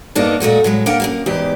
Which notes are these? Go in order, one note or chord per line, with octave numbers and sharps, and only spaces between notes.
G2 A#3 B3 D4 D#4
A#2 G#3 A3 F#4
A2 F#3 G#3
A#3 D4 A#4 F#5 G5
F#2 C#3 A#3
E2 G#2 G4